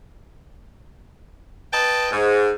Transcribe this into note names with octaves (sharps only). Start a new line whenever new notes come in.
B4 D#5 G5 A5
G#2